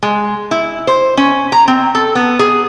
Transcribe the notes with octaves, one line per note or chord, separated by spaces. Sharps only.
G#3
E4
C5
C#4
A#5
C4
A4
B3
G#4